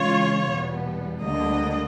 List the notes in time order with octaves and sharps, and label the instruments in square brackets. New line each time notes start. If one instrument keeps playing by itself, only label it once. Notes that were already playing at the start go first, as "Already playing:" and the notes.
Already playing: [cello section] C#3 E3 G#3 C#4 F4 [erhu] C#5
[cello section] E2 B2 G3 B3
[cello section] D2 D3 G3 A#3 D4 [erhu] D#5